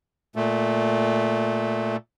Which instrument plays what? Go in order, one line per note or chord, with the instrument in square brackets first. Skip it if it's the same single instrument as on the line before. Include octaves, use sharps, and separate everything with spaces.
[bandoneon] A#2 A3